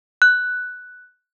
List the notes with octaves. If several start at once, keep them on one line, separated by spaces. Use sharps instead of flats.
F#6